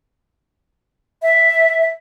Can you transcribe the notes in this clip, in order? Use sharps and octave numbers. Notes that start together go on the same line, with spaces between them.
E5